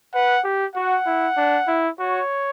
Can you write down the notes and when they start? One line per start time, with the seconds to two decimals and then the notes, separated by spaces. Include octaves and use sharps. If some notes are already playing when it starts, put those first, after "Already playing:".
0.15 B4 F#5
0.44 G4
0.75 F#4 F#5
1.06 E4
1.37 D4
1.68 E4
1.99 F#4 C#5